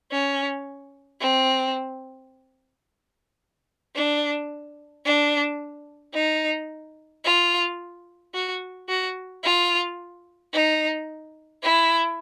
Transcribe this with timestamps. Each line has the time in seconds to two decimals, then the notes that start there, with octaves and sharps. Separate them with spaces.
0.11 C#4
1.21 C4
3.95 D4
5.05 D4
6.14 D#4
7.25 F4
8.34 F#4
8.89 F#4
9.44 F4
10.53 D#4
11.63 E4